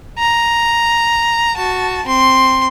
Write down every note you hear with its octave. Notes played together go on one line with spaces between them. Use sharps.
A#5
F#4 A5
C4 C6